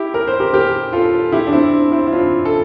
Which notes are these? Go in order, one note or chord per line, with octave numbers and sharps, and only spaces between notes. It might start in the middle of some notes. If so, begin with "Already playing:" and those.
Already playing: E4 G4
A#4
C5
G4 A#4
G4 A#4
F4 A4
E4 G4
D4
C4 E4
C4 E4
E4
D4 F4
A4